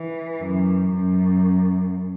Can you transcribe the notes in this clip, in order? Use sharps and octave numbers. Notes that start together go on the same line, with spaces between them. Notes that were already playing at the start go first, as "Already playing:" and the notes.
Already playing: E3
F#2
F#2